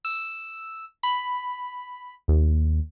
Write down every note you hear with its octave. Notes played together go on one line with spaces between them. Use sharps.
E6
B5
D#2